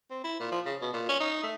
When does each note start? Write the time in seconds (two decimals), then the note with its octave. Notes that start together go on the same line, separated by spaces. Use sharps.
0.11 C4
0.24 E4
0.40 A#2
0.52 F3
0.66 C#3
0.81 B2
0.93 A#2
1.09 C#4
1.20 D#4
1.43 A3